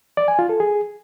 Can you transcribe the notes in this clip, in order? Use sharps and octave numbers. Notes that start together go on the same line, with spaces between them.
D5
G#5
F4
A4
G#4